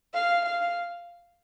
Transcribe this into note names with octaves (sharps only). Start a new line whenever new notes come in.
F5
F5